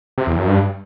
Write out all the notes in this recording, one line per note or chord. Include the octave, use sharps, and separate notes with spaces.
C3
E2
F#2
G2